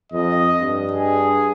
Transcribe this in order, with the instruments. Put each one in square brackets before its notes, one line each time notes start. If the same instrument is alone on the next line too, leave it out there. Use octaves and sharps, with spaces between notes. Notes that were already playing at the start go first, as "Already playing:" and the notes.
[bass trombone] F2 [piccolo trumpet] D#5
[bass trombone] G2
[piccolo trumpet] G#4